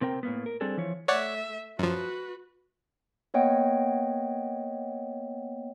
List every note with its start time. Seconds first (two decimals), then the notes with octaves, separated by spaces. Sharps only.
0.01 C3 C4 A#4 G5
0.23 A2 A#3 B3
0.46 A#4
0.61 G3 C4 D4 G#4 A4
0.77 E3 F3 C#5
1.08 A3 C#5 D5 E5 F#5
1.79 F#2 F3 F#4 B4
3.34 A#3 B3 C#5 D#5 F#5 G5